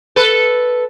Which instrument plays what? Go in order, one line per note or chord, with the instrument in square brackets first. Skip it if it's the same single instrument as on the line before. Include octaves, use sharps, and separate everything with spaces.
[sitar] A4 B4